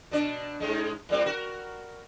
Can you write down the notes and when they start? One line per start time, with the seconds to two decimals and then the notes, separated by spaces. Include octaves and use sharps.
0.11 B2 D4
0.60 G#2 G#3
1.09 A2 G3 C4
1.26 F#4 A#4